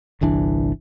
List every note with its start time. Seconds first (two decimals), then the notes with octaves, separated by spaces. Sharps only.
0.21 G1 C2 E3 D4